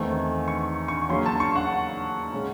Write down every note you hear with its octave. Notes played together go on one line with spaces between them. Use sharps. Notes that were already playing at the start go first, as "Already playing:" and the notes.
Already playing: E2 D#3 A3 C4
C#6
C#6
D#2 C#3 F#3 C#4 C6
A5
C#6
F#5
C#3 G#3 C#4